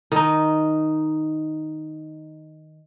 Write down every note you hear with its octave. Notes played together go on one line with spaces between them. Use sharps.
D#3 D#4